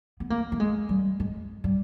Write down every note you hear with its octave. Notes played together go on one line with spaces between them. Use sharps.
B3
A#3
A3
G#3
G3
G#3
G3